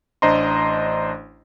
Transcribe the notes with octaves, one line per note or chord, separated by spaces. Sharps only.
A1 D4 C5 D#5 A#5 C6